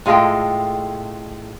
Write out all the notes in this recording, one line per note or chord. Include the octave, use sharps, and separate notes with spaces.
A2 G#3 F4 A4 G5